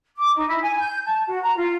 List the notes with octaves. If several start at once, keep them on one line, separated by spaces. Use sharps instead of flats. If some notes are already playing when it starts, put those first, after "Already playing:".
D6
D#4
E4
G#5
G6
A5
F#4
A#5
F4